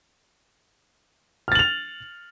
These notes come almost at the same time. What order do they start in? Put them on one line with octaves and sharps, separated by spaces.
F6 A6 F#7 F7